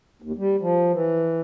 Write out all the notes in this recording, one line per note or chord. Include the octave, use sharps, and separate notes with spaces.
D#2
G3
F3
E3